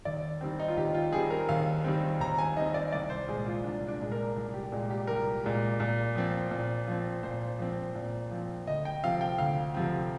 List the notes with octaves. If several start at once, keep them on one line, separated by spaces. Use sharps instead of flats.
D#2 D5
D#3 G3 C4
D#4
F4
D#2 G4
F4
D#3 G3 C4 G#4
A#4
D#2 F5
D#3 G3 C4
D#2 A#5
G#5
D#3 G3 C4 D#5
D5
C2 D5
C5
A#2 G#3 G#4
F4
C2 D4
D4
A#2 G#3
A#4
C2
G4
A#2 G#3
G4
C2 A#4
A#2 G#3
A#2
F3 C4
A#2
F3 C4
A#2 C5
F3 C4
A#2
F3 C4
D2 D#5
G5
C3 F3 C4 F5
G5
D2 F5
C3 F3 C4